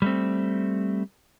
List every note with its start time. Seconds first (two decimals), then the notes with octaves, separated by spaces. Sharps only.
0.02 G3 A3 C4